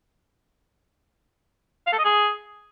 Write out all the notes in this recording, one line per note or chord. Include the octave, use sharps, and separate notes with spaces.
F5
A4
D#5
G#4